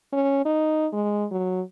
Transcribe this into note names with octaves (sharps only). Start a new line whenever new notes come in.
C#4
D#4
G#3
F#3